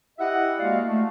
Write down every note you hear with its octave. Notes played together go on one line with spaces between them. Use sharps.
E4 G4 D#5 E5 F#5
G#3 A#3 F#4 D5 F5
A3